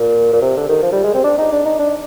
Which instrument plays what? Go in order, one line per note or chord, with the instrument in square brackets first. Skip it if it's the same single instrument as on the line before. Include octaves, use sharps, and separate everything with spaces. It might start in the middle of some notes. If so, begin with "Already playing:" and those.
Already playing: [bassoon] A#2
A#2
C3
D3
D#3
F3
G3
G#3
C4
D4
D#4
D4
D#4
D4